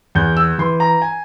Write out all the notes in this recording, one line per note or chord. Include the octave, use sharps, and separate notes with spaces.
E2 G6
E6
E3 C6
A#5
G#5